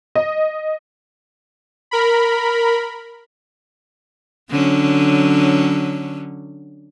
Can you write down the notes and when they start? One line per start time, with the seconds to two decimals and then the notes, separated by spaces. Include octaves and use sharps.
0.15 D#5
1.91 A#4 B5
4.50 D3 F#3 C#4